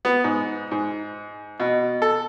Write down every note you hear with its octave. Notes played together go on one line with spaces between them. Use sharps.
B3
G#2
G#2
B2
A4